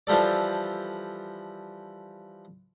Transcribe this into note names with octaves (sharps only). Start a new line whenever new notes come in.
E3 F3 G3 A4 D5